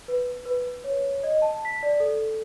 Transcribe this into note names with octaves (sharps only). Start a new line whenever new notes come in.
B4
B4
C#5
D#5
A5
B6
D5
A4